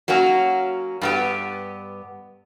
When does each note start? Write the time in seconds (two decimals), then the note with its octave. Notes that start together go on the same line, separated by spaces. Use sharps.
0.08 F#3 A#3 C#4 F#4
1.01 G2 B3 G4